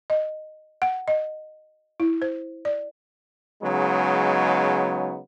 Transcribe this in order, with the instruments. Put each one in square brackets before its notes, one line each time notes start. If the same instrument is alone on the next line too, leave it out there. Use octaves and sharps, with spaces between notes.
[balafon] D#5
F#5
D#5
E4
C5
D5
[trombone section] C#3 F#3 G#3 B3 D#4